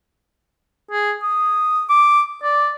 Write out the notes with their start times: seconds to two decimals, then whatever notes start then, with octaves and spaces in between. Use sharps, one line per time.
0.91 G#4
1.23 D#6
1.90 D6
2.43 D5